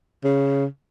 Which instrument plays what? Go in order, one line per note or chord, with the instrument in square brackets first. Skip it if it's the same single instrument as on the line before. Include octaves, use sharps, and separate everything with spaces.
[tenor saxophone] C#3